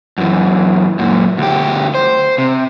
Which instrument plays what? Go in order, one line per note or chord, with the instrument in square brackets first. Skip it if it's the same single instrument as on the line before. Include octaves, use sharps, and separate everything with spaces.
[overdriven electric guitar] F#2 E3
F#2 A#2
D2 G4
C5
C3